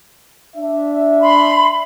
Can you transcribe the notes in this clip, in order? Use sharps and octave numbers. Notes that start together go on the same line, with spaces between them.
D4 E5
B5 C6